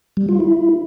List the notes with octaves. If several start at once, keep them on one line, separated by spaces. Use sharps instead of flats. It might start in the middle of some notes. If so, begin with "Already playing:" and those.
G3
F4
E4